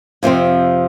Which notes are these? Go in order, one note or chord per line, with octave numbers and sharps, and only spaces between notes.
F2 C3 F3 C4